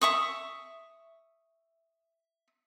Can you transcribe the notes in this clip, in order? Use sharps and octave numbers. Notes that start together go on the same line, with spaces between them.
E5 C#6 D#6